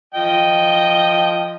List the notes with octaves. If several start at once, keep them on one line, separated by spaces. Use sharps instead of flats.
F3 D#5 G5